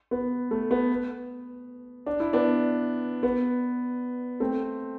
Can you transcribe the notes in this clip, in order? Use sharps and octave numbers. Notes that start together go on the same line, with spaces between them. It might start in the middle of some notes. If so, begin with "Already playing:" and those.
B3
A3
B3
D4
E4
B3 D4
B3
A3 C4